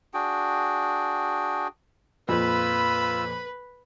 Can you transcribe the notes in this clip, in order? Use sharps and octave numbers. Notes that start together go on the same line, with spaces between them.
D4 F#4 G#4 G5
F2 A#2 F4 B4 B5 E6